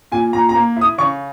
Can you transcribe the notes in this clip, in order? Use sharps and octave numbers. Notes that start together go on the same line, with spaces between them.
A#2 G#5
A#2 A#5
A#5
A#3
E4 D#6
C#3 C#6